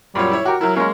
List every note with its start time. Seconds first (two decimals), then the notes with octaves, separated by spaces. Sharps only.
0.15 F#2 A#2 G3 C#5
0.32 E4 C#5
0.46 F#4 G4 A#4
0.61 F#3 E4 A#4
0.76 G#3 A#3 C#4